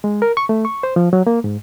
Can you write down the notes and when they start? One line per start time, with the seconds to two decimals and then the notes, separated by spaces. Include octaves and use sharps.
0.04 G#3
0.22 A#4
0.37 C#6
0.49 A3
0.65 C#6
0.83 C5
0.96 F3
1.13 F#3
1.27 A#3
1.44 G#2